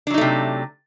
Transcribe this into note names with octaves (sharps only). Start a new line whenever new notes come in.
C3 F#3 A3 D4 D#4